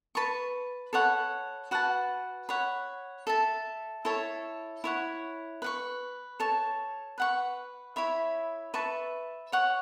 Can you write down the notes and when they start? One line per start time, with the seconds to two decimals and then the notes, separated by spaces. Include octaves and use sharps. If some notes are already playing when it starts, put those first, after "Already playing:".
0.15 B4 A5 C#6
0.93 A4 C#5 F#5 B5
1.71 F#4 B4 F#5 A5
2.49 C#5 F#5 B5
3.27 A4 E5 A5
4.05 E4 A4 C#5 A5
4.84 E4 C#5 F#5
5.62 B4 F#5 C#6
6.40 A4 C#5 A5
7.18 B4 F#5 C#6
7.96 E4 C#5 E5 B5
8.74 B4 E5 A5 C#6
9.52 C#5 F#5 C#6